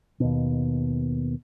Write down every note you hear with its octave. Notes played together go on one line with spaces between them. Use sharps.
D#2 B2